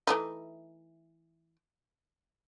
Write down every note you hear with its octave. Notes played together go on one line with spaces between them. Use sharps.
E3 A3 D#4